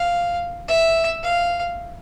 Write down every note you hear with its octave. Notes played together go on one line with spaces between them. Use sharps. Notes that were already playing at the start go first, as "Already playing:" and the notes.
Already playing: F5
E5
F5